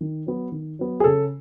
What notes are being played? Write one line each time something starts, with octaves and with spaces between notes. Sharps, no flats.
D#3
F#3 B3
D#3
F#3 B3
G#4
C#3 A4